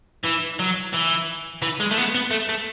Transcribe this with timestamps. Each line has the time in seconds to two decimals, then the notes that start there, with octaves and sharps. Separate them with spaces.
0.25 E3
0.60 F#3
0.93 E3
1.62 E3
1.80 G#3
1.91 A3
1.97 B3
2.15 B3
2.31 A3
2.49 A3